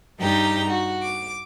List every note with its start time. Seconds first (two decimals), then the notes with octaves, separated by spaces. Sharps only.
0.19 G2 D#4 G4 A#5
0.70 F#4
1.02 D6